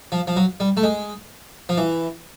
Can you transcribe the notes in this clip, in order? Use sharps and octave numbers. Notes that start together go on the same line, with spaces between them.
F3
F3
F#3
G3
A3
G#3
F3
E3